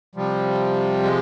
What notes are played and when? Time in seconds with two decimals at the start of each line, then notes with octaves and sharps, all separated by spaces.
0.15 C3 F3 G3
1.04 G#3